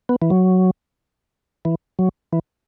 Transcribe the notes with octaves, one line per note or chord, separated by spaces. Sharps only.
B3
E3
F#3
E3
F#3
E3